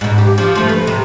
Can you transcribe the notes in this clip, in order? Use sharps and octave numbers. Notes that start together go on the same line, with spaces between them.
G#2 B2
G4
F3
F3 A3
B4
C3